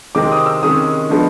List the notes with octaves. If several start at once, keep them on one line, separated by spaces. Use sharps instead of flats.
C3 D#3 G#3 C4 D6
D#6
E6
C3 D#3 G#3 C#4 D#6
D3 F3 G#3 B3